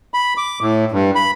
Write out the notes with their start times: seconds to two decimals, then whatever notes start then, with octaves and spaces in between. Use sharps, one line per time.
0.14 B5
0.37 D6
0.61 A2
0.92 G2
1.15 B5